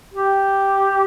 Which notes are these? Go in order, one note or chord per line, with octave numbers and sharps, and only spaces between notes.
G4